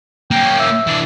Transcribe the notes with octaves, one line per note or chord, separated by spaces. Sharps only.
A#3 C#4 G5
E5
E3 D4